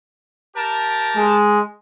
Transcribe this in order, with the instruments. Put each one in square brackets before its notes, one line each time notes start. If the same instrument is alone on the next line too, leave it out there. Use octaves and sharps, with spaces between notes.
[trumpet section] G4 A#4 A5
[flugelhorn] G#3